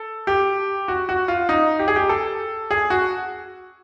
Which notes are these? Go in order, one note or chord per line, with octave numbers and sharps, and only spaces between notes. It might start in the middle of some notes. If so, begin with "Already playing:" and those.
Already playing: A4
G4
F#4
F#4
F4
D#4
G4
G#4
G4
A4
G#4
F#4